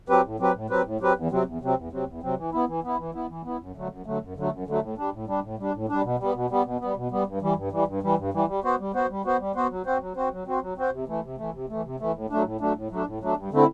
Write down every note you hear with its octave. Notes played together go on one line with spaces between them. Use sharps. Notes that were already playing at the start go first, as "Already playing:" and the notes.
F#3 C4 G4 B4
A2
F#3 C4 G4 B4
A2
F#3 C4 G4 B4
A2
F#3 C4 G4 B4
E2
C3 F#3 C4
E2
C3 F#3 C4
E2
C3 F#3 C4
E2
C3 F#3 C4
E3
B3 E4
E3
B3 E4
E3
B3 E4
E3
B3 E4
F#2
D3 F#3 A3
F#2
D3 F#3 A3
F#2
D3 F#3 A3
F#2
D3 F#3 A3
A2
G3 D4
A2
G3 D4
A2
G3 D4
A2
G3 D4
B2
G3 B3
B2
G3 B3
B2
G3 B3
B2
G3 B3
G2
E3 G3
G2
E3 G3
G2
E3 G3
G2
E3 G3
G3
B3 F#4 C5
G3
B3 F#4 C5
G3
B3 F#4 C5
G3
B3 F#4 C5
F#3
C4 F#4 C5
F#3
C4 F#4 C5
F#3
C4 F#4 C5
F#3
C4 F#4 C5
C3
E3 A3
C3
E3 A3
C3
E3 A3
C3
E3 A3
A2
F#3 A3 D4
A2
F#3 A3 D4
A2
F#3 A3 D4
A2
F#3 A3 D4
G2
D3 A3 C4 E4